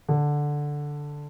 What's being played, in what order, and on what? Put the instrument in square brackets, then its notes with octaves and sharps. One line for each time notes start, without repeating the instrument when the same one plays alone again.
[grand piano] D3